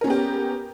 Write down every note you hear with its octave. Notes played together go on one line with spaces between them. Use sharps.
B3 C#4 G4 A#4